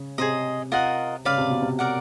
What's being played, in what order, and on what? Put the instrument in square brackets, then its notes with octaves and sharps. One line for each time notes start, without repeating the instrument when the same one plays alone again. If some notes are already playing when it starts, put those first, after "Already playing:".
Already playing: [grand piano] C#3
[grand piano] C3 [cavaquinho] G#4 C5 D#5
[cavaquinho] F4 A#4 D#5 F#5
[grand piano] C#3 [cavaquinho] B4 D5 F5
[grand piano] C3
B2
C3
[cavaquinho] A#4 D5 F#5